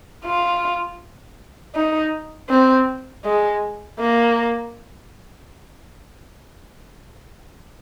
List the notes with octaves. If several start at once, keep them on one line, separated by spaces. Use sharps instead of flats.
F4
D#4
C4
G#3
A#3